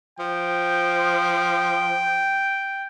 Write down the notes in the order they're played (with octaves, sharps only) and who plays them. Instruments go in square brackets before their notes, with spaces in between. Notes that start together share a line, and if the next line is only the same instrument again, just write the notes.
[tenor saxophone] F3 [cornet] G5